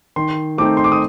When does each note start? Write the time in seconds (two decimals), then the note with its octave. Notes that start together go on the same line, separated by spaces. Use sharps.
0.16 D#3 C6
0.58 A3 C4 D#4 D6
0.77 C6
0.84 D6
0.92 D#6